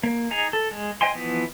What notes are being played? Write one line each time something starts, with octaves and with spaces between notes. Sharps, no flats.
A#3
D#4 G#4 A#5
A4
G#3
C5 D#5 G5 G#5 C6
E3 F3 B3